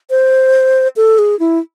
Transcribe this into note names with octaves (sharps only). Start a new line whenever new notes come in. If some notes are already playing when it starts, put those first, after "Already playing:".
C5
A4
G#4
E4